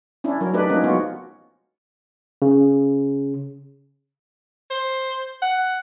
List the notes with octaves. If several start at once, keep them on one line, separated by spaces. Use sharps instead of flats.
C#4 D4 E4
F#3 A#4
A3 D4 D#4 G4 B4
F3 F#3 G#3 A#3 C#4 D#4
F#3 B3 F4 F#4
C#3
C5
F#5